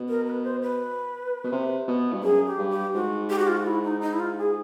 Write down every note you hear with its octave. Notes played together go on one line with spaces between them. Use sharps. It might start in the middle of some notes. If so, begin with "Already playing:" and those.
Already playing: B2
A#4
B4
C5
B4
B2
C3
B2
G2
F#2 G#4
G4
G2
G4
G#2 F#4
G4
F#4
F4
F#4
E4
D#4
D#4
E4
F4
G#4